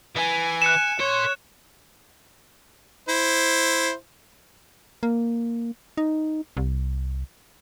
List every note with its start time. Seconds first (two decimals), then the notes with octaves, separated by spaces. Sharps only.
0.16 E3 G#5
0.62 F#6 C#7 E7
1.00 A#4 C#5 C6
3.08 E4 C5
5.03 A#3
5.97 D#4
6.57 C2